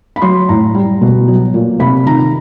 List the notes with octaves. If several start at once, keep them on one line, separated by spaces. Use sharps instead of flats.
B5
F#3 C6
A2 A#5
G3
B2
F#3
A#2
C3 B5
D#3 A#5